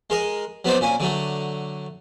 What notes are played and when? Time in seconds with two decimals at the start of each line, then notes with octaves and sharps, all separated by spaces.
0.10 G#3 A#4 D#5
0.65 F#3 B3 D#4 C5 D5
0.81 A#2 C#4 G#5
1.00 D3 F#3 A3